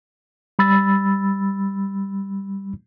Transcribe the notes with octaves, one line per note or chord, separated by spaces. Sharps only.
G3 B5 E6 A6